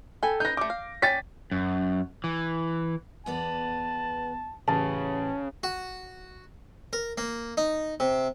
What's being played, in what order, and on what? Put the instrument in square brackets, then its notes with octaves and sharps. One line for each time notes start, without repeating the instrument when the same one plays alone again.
[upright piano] A4 [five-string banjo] G5 G#5 B5
[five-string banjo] D#4 B4 [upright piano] G6 A#6
[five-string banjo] G3 A3 [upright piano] D6
[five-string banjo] F5
[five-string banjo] C#4 D5 G5 [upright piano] A6 B6
[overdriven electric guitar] F#2
E3
[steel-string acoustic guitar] E2 B3 D5 [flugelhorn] A5
[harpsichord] A1 [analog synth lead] C#3 [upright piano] A5
[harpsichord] F#4
A#4
A#3
D#4
C3